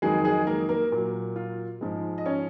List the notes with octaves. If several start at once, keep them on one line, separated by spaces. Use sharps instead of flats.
F2 D#3 F#3 G#3 G#4
G#3 G#4
A#3 A#4
A#3 A#4
A#2 F#3
F4
G#2 F3 G#3
D#5
C#4 C#5